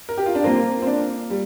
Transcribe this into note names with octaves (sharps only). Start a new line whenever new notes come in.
A#4
G4
F4
D4
A#3 C4 F4 A#4
C4
D4
G3